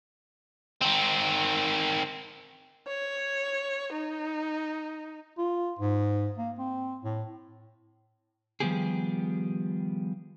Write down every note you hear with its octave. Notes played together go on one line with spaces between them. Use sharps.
D#3 C4
C#5
D#4
F4
G#2
A#3
C4
A2
D#3 F3 G3 B3 G4 G#4